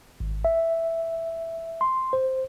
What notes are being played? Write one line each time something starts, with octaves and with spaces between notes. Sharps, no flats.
G#1
E5
C6
C5